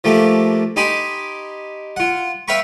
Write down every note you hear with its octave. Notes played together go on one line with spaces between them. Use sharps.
F3 A3 A#3 G4
D#4 G4 G#5 B5 C6 D6
F4 F#5
B4 E5 F5 G5 B5 C#6